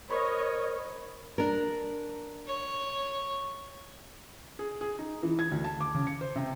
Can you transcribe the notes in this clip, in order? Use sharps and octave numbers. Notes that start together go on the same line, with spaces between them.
A#4 C5 C#5 D#5 B5
D4 A#4
C#5
G#4
G#4
D#4
E3
G#6
D2
A5
D6
C#3
C#7
C5
C3